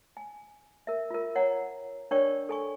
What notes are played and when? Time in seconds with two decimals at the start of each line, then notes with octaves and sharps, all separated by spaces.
0.17 G#5
0.87 A#4 E5
1.10 F4 A#4
1.35 C#5 F#5 G5 A#5
2.11 D4 A#4 C#5 D5 G5 C#6
2.49 A4 G#5 C#6